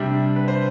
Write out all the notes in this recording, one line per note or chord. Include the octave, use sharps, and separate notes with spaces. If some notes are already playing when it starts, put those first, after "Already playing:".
Already playing: C3 G3 D4
B4
C5